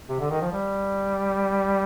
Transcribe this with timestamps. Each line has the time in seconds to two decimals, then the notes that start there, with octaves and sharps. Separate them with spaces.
0.09 C3
0.20 D3
0.30 D#3
0.41 F3
0.52 G3